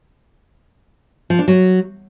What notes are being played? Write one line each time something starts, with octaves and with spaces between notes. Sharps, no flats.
F3
D4
F#3